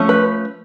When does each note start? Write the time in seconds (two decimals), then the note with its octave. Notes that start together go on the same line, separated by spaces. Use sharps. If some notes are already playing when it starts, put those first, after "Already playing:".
Already playing: F3 A3 C#4
0.09 B4